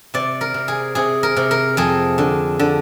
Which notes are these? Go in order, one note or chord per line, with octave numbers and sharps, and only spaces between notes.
C3 D5
A#4
C3
G#4
C3 G#4
A#4
C3
A#4
F2 G#4
D3
D3